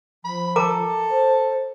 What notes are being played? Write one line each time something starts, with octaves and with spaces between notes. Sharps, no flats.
F3 B5
A4 A#4 A#5 D6
C5